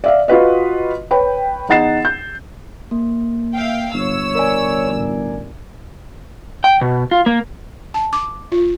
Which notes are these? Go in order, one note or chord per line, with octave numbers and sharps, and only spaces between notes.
D5 E5 F5
F4 F#4 B4 D#5
B4 C#5 G5 B5
E2 D#4 F#5 A6 C7 E7
G6
A#3
E5 F5 G5
G1 C#5 E6
A#4 D5 G#5
A1
G5
B2
F4
A#3
A5
D6
F4